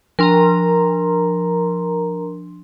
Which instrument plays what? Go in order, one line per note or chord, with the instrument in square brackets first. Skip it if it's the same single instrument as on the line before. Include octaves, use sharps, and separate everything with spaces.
[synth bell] F3 D4 C6 [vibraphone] A#4 A#5